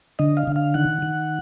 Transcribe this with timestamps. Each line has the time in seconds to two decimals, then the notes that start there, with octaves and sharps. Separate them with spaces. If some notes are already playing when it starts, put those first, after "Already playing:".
0.19 D3 D#5
0.37 F5
0.47 D3
0.56 F5
0.74 D#3 F#5
1.02 D#3